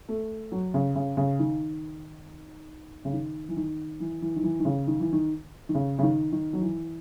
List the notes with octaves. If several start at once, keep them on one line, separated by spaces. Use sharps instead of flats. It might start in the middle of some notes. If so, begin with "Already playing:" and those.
A3
F#3
C#3
C#3
C#3
D#3
C#3
D#3
E3
D#3
E3
E3
D#3
E3
D#3
C#3
D#3
E3
D#3
D#3
C#3
C#3
D#3
D#3
F#3
E3